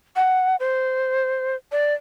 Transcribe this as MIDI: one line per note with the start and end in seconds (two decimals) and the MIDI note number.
0.16 0.56 78
0.60 1.56 72
1.72 1.94 74